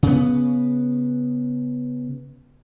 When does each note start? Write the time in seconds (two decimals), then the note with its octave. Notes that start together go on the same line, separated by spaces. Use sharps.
0.03 C#3 B3